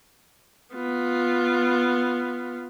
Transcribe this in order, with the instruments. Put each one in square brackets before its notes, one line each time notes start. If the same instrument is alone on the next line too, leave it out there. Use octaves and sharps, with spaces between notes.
[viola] B3 F4